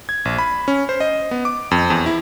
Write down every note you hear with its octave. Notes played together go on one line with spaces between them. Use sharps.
G#6
A#1
B5
C#4
C5
D#5
B3
D6
F2
E2
E4